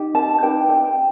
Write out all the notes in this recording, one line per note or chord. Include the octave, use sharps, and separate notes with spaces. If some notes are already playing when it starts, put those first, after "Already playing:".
Already playing: D#4 G4
A5
D#4 G4 B4 G5
G5